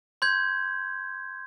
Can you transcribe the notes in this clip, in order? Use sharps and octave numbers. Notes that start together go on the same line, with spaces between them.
C6 G6 G#6